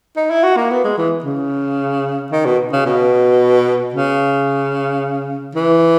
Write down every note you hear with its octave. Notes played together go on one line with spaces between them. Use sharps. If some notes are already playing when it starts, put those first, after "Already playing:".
D#4
E4
F#4
A#3
B3
G#3
E3
C#3
D#3
B2
C#3
B2
C#3
E3